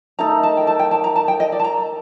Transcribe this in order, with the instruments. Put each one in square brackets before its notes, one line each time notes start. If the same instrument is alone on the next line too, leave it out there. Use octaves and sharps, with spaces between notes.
[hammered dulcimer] D#3 A3 D#4 A4 [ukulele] A#5
[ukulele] A5
G5
A5
G5
A5
A#5
A5
G5
D#5
D5
A5
A#5